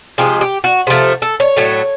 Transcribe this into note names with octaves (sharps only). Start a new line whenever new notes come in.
C3 F3 G#3 G4
G4
F#4
C3 F3 A3
A4
C#5
A2 F#3 A3